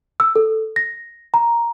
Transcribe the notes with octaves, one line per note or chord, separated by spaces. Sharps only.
E6
A4
A#6
A#5